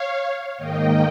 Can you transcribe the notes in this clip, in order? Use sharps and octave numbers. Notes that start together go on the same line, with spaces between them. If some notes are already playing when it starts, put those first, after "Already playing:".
Already playing: C#5 F5
G#2 D#3 A#3 D#5 G5